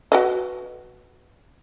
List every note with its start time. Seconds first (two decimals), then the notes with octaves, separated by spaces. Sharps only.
0.12 F#4 B4 D#5